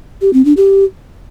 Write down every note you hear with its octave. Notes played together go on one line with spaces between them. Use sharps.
G4
C4
D4
G4